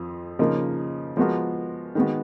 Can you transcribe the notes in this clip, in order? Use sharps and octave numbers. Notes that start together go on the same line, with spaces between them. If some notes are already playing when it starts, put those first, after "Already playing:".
Already playing: F2 F3
C#3 F3 A#3 D#4
F3 G#3 B3 F#4 A#4
D#3 G#3 B3 F#4